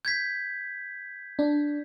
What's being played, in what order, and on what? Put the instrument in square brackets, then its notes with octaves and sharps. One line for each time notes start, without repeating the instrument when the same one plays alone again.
[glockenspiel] G6 G#6 B6
[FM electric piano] D4